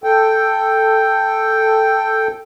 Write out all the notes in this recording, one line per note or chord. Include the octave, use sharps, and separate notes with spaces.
A4 G5